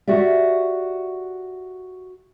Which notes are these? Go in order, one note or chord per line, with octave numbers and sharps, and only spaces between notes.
F#4 G4 D5 E5